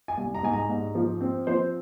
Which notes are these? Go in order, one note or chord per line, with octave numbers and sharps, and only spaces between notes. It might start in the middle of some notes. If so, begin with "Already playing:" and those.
G#5
C2
A#5
G#2 G#5
A#5
G#2
F3
C4
F3 C5